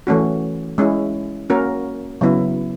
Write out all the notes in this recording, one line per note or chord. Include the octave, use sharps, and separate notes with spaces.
E3 A3 C#4 F#4
G#3 C#4 E4
A#3 C#4 F#4 A#4
C#3 F#3 B3 E4